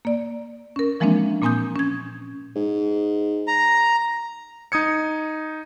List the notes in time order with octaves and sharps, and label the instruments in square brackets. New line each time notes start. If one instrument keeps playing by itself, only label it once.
[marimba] A#3 D5
C#4 A#4
E3 F3 G#3 A#3 C4 D4
A#2 A#3 C4 G#5 D#6 G6
C#4 G#6
[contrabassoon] G#2
[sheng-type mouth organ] A#5
[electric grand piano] D#4 D#6 G#6 C#7